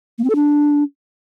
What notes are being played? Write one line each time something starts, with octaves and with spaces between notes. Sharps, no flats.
A#3
C4
A4
D4